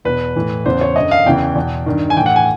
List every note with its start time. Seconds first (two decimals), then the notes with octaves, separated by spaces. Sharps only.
0.05 E2 B2 B4
0.36 A2 E3
0.65 E2 C#3 E3 C5
0.81 C#5
0.96 F#2 D3 D#5
1.11 F5
1.26 E2 C#3 E3 G5
1.55 E2 B2
1.86 G2 D#3
2.10 G#5
2.17 A2 E3 G5
2.26 F#5
2.36 G#5